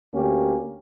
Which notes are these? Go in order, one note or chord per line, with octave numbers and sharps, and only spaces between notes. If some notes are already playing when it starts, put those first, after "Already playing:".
D2 A#3 C#4 G4